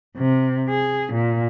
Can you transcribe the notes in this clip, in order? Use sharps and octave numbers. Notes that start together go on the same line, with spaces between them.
C3
G#4
A#2